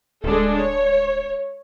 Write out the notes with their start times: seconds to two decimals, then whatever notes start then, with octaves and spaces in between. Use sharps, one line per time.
0.24 D1 G#3 D4 A4
0.56 C#5